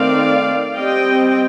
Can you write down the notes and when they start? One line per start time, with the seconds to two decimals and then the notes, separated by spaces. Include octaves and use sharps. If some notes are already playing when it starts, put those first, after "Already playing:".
Already playing: D#3 A3 C4 D5 F5
0.76 G3 C4 D#5 G5